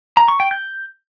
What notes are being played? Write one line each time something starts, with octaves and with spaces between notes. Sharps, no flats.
A#5
C#6
G5
G6